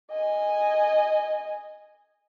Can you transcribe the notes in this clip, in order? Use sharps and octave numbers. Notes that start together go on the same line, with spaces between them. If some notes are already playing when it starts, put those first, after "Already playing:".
D#5 G#5